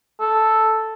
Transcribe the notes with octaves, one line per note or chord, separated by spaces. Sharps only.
A4